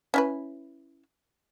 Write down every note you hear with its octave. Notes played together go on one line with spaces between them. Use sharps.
C#4 E4 B4